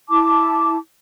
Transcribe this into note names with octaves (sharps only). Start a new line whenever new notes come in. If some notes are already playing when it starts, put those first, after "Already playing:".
E4 A5 D6